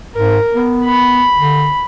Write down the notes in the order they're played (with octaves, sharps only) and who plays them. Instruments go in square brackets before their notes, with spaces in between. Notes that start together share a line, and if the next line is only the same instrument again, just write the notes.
[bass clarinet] G#2 [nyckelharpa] A#4
[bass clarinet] B3
[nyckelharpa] B5
[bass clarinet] D3